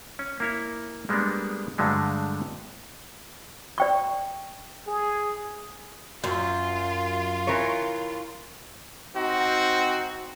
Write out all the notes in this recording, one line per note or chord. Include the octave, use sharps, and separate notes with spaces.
C#4
A#3 E4 C#5
G3 G#3 A#3 B3 D4
G2 D3 F#3 G#3 A3
D5 G5 C#6
G#4
F#2 F4
E3 A#4 C#5
C4 D#4 F#4